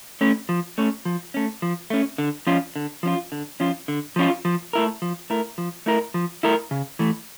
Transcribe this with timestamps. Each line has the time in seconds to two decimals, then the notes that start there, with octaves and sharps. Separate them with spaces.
0.21 A3 C#4
0.49 F3
0.78 A3 C#4
1.05 F3
1.34 A3 C#4
1.62 F3
1.90 A3 C#4
2.18 D3
2.47 F3 C#4 F4
2.76 D3
3.03 F3 C#4 F4
3.32 D3
3.60 F3 C#4 F4
3.88 D3
4.16 F3 C#4 F4
4.45 F3
4.73 A3 E4 A#4
5.02 F3
5.30 A3 E4 A#4
5.58 F3
5.86 A3 E4 A#4
6.14 F3
6.43 A3 E4 A#4
6.71 C#3
6.99 E3 A3